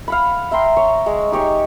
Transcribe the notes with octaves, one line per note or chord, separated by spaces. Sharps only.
F5 F#5 B5
E5 G5 A#5 C6
C#5
G#3
D#4 G4 C#5 G#5